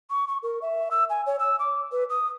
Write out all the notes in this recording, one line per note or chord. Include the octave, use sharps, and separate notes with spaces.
C#6
C#6
A#4
E5
E6
G#5
C#5
E6
D6
B4
D#6